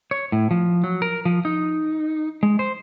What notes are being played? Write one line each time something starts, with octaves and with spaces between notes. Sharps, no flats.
C#5
A2
F3
F#3
A#4
F3
D#4
G#3
C5